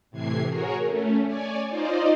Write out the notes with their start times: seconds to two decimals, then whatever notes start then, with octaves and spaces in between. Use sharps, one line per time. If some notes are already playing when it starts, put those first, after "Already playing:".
0.11 A2 C3 E3 G#6 C7
0.48 F#4 G#4 A#4 C#5
0.82 A3 C#4
1.26 C#5 D5 G#5
1.69 D#4 F4 C5 D5 D#5